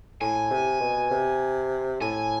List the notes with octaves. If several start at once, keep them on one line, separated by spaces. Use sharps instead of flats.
A2 G#5
C3
B2
C3
A2 G#5